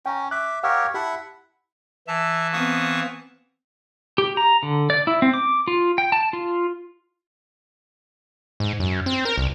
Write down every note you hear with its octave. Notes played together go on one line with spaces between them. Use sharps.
C#4 G5 A#5
E5 D6 F#6
G4 A#4 C#5 F5 F#5 E6
E4 G4 E5 F#5 A5
E3 E5 A5
B3 C4 F5 C#6 D#6
G4
A#5
D3
D5
E4
C4
D6
F4
G5
A5
F4
G#2
F#2
C4
A#4
C2